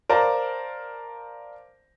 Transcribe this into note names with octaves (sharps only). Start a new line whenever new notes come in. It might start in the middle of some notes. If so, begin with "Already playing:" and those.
A#4 C5 D5 F5 A5